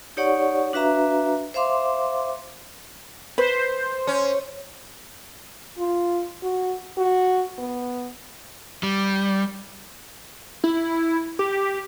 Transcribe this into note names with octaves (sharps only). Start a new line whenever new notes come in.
D#4 G4 C#5 D5 F#5 C#6
D4 F#4 B4 E5 F5 A#5
C5 E5 F5 C6 D6
B4 C5
C#4
F4
F#4
F#4
B3
G3
E4
G4